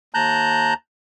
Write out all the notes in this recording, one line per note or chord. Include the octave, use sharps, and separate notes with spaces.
D#2 A5 A#5 F#6 G6